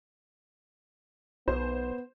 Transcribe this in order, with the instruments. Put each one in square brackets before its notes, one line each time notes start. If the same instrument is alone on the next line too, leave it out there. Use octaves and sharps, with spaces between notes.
[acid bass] B1 [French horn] B3 [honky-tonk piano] C5